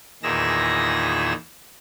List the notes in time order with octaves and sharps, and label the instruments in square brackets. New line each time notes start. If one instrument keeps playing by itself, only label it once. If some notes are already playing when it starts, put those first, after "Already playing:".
[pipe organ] E2 A#2 D#3 G#4 E6 A#6